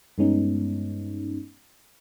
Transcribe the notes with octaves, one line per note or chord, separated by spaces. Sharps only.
G2 G#3 B3 C#4 D#4